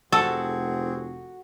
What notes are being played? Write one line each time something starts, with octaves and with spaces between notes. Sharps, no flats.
F1 C4 F#4 G#4 A4